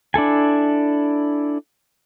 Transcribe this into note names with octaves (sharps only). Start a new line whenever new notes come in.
D4 E4 A4 G#5